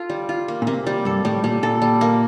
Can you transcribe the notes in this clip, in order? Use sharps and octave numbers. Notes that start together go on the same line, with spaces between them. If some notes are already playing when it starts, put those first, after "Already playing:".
Already playing: F4 A4
G3
F4
A#3
A#2
C3 A#3
G3
G2 A4
A2 G3
A#2 G3
A#2 A4
G3
A#3